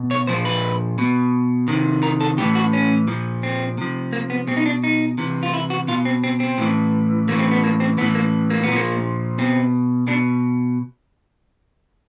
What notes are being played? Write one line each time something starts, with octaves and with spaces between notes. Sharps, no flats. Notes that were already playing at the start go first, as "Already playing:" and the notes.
Already playing: B2
C#5
A#2 F3 C5
B4
B2
C3 D#3
A#4
A4
A2 E3 G4
F#4
C#4
A#2 F3
C4
C3 F3
A#3
B3
B2 C4
D#4
D4
D#4
C3 E3
F4
E4
F#4
B2 F4
C4
C4
C4
A2 E3
A2 E3 A#3
C4
B3
A#3
C4
A2 E3 B3
A#3
A#3
A#2 B3
F3 A#3
B2 C4
B2 D4